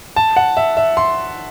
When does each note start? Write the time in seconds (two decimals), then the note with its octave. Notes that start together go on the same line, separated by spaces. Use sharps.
0.16 A5
0.37 F#5
0.57 E5
0.77 E5
0.97 C6